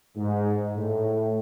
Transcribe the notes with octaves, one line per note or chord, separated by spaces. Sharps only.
G#2
A2